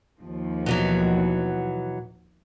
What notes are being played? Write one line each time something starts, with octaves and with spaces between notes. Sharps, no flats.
D#2 F3
B2 E3 F#3